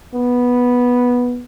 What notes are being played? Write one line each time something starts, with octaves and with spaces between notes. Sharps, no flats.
B3